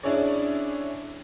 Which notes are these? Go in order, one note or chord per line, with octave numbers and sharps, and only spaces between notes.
C#4 D4 E4 G#4 C#5 D5